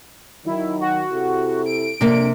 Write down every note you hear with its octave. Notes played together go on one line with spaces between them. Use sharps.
D#3 F#3 E4
F#4
C3 E4 A4
D7
F2 C3 A#3 D4